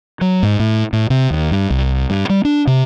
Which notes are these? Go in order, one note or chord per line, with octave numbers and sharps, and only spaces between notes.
F#3
G#2
A2
A2
C3
D#2
G2
C2
G2
G3
D4
C3